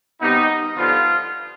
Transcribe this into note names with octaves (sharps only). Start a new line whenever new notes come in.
C3 G3 B3 D#4
G2 D3 F3 B3 F4